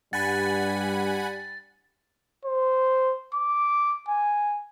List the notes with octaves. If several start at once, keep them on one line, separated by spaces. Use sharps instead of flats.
G2 G3 F#5 G#5 B5 A6
C5
D6
G#5